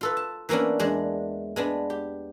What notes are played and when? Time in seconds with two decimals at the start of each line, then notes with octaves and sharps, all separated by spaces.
0.01 F4 A4 B4
0.17 A5
0.49 E3 A#3 B3 C#4 D4
0.79 E2 G#3 D4
1.56 G#3 B3 D4
1.90 G4